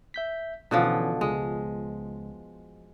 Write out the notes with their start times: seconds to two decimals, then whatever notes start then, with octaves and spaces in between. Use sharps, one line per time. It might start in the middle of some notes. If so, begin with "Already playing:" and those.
0.14 E5 G6 B6
0.71 B2 D3 E3 F3 C#4 D4
1.21 C#2 G#3